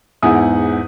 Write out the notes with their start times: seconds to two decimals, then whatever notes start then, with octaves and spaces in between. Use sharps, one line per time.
0.22 E2 G#2 E4 F#5 G#5 D#6